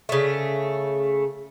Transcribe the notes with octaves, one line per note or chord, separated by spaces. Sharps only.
C#3 A3